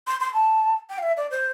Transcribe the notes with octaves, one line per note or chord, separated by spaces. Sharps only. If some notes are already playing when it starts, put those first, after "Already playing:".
C6
C6
A5
G5
F5
E5
D5
C5